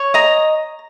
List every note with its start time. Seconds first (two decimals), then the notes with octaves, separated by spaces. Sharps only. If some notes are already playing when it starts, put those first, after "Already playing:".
Already playing: C#5
0.14 D#5 A#5